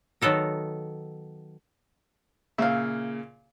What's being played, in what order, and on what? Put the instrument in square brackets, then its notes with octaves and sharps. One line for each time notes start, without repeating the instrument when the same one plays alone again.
[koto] D#3 F#3 B3 A4 A#4
[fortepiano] A#2 C#3 [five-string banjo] E5 F5